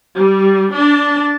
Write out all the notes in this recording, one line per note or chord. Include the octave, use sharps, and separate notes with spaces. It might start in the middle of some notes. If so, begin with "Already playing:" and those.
G3
D4 A5